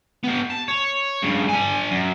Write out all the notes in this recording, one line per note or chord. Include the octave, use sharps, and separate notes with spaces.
B3 G4
A5
C#5
G2 C#3
D4 G#5
F#2